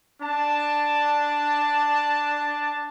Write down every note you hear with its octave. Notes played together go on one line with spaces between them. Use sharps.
D4 A5